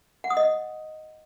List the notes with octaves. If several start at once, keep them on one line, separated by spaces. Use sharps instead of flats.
F#5
D#6
D#5